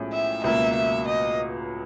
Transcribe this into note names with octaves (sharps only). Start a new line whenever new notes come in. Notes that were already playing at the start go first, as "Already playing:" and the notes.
Already playing: B1 A2 F3 G#3 C#4
E5
C#2 B2 F#3 A#3 E5
E5
D#5